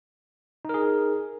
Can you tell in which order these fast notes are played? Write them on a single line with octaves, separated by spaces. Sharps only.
D#4 A#4 G#4